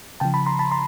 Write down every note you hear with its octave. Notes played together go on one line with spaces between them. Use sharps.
C#3 F3 G5 A5
A5 B5
A#5 C6
A5 B5
A#5 C6